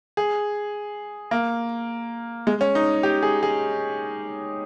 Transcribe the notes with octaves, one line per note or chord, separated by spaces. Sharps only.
G#4
A#3
G#3
C#4
D#4
G4
G#4
G#4